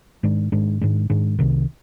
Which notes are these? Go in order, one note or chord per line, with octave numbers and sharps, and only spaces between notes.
G#2 D#3 G#3 D4
G#2 D#3 G#3 D4
G#2 D#3 G#3 D4
G#2 D#3 G#3 D4
C2 C3 D#3